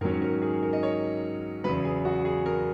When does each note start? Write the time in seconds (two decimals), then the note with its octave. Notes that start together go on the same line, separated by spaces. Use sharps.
0.01 G#2 D#3 F#3 C#4 A#4
0.22 A#4
0.42 G#4
0.63 A#4
0.73 D#5
0.83 C#5
1.64 E2 C#3 F#3 B4
1.84 G#4
2.05 F#4
2.25 G#4
2.46 A#4